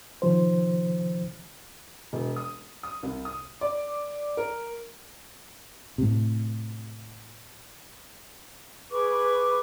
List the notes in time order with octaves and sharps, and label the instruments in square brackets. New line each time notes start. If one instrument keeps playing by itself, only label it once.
[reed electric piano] C3 D#3 F3 C5
[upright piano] E1
D#6
D#6
C2
D#6
D5
A#4
[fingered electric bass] A2 C3
[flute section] G#4 B4 C#6 D6